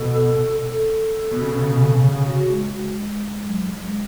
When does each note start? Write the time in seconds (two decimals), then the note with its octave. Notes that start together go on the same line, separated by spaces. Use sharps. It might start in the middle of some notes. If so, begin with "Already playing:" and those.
Already playing: B2 A4
0.60 A4
1.31 B2
1.41 C#3
1.51 B2
1.61 C#3
1.71 B2
1.81 C#3
1.91 B2
2.03 C#3 G#4
2.27 F#4
2.51 G#3
3.46 F#3
3.83 G#3